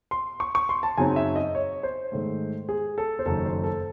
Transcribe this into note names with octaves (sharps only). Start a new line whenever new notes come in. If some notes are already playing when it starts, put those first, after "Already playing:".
C6
C#6
C#6
C6
A5
F#2 C#3 F#3 C4 D#4 G#5
E5
D#5
C#5
C5
G#2 D#3 A3
G#4
A4
C5
F#1 F#2 D#3 A4
C5
A4